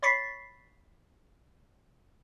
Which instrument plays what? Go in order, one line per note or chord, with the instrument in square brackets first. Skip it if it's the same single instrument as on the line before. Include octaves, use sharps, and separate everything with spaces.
[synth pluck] C#5 B5 C#6 A6 B6 C7